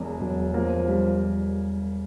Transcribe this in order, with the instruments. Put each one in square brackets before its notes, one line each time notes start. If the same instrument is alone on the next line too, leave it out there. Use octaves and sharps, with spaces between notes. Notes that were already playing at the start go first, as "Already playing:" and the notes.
Already playing: [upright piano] E1 E2
[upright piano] E1 [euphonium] F#3
[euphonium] F3 [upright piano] A#3
[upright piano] G3